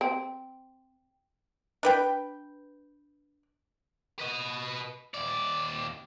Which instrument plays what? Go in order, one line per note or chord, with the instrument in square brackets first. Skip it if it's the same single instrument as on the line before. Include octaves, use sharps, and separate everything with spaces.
[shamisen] C4 [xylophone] G5
[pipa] D4 B4 G5
[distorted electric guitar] B4 D#5
D#2 D5